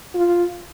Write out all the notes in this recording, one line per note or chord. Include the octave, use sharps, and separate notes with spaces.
F4